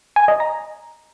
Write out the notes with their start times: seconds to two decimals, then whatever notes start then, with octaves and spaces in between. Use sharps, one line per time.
0.16 G#5
0.28 D#5
0.40 A#5